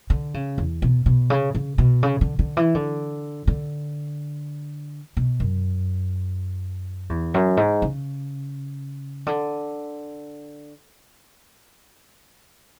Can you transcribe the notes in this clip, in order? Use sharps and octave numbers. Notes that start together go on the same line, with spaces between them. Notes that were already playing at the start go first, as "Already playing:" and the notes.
D3
C#3
E2
B2
B2
C#3
C#3
B2
C#3
D3
D3
E3
D3
D3
B2
F#2
E2
F#2
G#2
C#3
D3